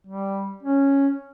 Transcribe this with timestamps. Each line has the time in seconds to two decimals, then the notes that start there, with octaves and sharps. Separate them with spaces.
0.07 G3
0.62 C#4